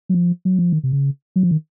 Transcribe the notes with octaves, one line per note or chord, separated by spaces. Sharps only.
F#3
F3
F#3
F3
D#3
C3
C#3
F#3
F3
D#3